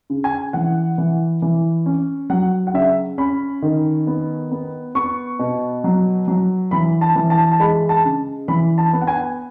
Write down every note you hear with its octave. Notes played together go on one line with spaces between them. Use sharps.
C#3
G#5
E3 F#5
E3
E3
C#4
F#3 F#5
F#5
C#3 E5
C#4 B5
D#3
B3
B3
B3 C#6
B2
F#3
F#3
E3 B5
A5
E3
A5
A5
G#3 B5
A5
C#3
E3 B5
A5
B3
F#5
G#5